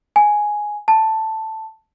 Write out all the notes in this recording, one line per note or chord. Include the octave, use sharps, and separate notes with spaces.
G#5
A5